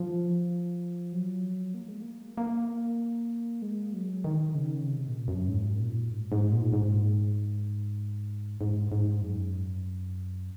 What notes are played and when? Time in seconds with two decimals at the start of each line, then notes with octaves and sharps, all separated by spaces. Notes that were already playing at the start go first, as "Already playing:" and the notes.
Already playing: F3
1.13 F#3
1.74 A#3
1.88 G#3
2.02 A#3
2.37 A#3
3.62 G#3
3.94 F#3
4.24 D#3
4.55 C#3
4.86 C3
5.07 A#2
5.28 F#2
5.48 G#2
5.80 A#2
6.11 G#2
6.32 G#2
6.52 A#2
6.73 G#2
8.61 G#2
8.92 G#2
9.22 F#2